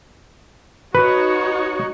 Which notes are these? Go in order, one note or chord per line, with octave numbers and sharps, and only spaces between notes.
D#4 F#4 B4 C#5